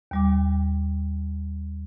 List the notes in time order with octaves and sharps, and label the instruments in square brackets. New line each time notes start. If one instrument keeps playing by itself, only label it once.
[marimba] D#2 G3 D6